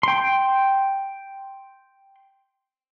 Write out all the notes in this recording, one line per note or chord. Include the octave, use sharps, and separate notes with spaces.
G5 C6